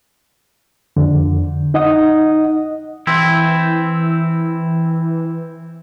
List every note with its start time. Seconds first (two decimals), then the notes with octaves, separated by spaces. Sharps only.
0.96 F2 D3
1.74 D#4 D#5 F#5 D#6
3.07 E3 C4 E4